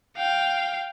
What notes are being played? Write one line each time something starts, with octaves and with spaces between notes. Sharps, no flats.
F5 G5